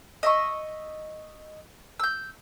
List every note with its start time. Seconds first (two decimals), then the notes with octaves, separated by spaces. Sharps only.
0.23 D#5 E5 C#6
2.00 E6 G6